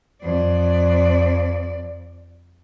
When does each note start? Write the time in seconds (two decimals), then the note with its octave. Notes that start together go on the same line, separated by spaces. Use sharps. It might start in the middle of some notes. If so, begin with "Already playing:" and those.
0.22 F2 D5